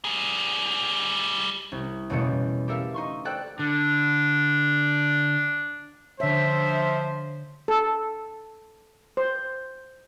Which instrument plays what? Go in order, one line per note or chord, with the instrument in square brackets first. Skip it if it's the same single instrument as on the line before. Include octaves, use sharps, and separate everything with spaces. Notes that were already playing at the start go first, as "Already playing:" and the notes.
[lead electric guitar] G3 G#4
[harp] C2
F#1 E2 B2 E3 A3 C#7
G3
G4 A4 A#4 E5 F5
D#4 C6 C#6
A4 C5 D5 G5 F#6
[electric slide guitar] D3 [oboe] D4
[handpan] D3 C#5 [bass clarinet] F3 [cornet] C5 [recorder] E5
[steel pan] A4
C5